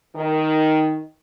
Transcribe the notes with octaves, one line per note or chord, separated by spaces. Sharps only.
D#3